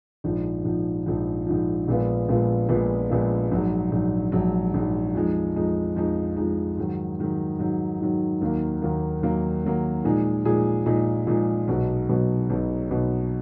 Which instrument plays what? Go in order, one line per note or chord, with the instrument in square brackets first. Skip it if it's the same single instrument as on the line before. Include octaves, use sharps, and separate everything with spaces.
[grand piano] A#1 G#2 F3
A#1 G#2 F3
A#1 G#2 F3
A#1 G#2 F3
A#1 A#2 G#3 B3 F4
A#1 A#2 G#3 B3 F4
A#1 A#2 G#3 B3 F4
A#1 A#2 G#3 B3 F4
A#1 G#2 F#3
A#1 G#2 F#3
A#1 G#2 F#3
A#1 G#2 F#3
F2 F3 G#3 D#4
F2 F3 G#3 D#4
F2 F3 G#3 D#4
F2 F3 G#3 D#4
G#2 D#3 F#3
G#2 D#3 F#3
G#2 D#3 F#3
G#2 D#3 F#3
D#2 D#3 F#3 A#3
D#2 D#3 F#3 A#3
D#2 D#3 F#3 A#3
D#2 D#3 F#3 A#3
A#2 F3 G#3 D#4 G#4
A#2 F3 G#3 D#4 G#4
A#2 F3 G#3 D#4 G#4
A#2 F3 G#3 D#4 G#4
B1 B2 F#3
B1 B2 F#3
B1 B2 F#3
B1 B2 F#3